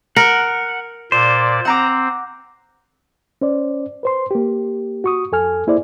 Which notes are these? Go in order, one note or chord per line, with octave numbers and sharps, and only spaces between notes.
A#4 F#5
A#2 C5 D5
C4 F#5 A#5 D6
C#4 C5 D5
B4 C5 C6
A#3 G4
F#4 C#6 D#6
F2 A4 G#5 F6
A#3 E4 G#4 C5 D5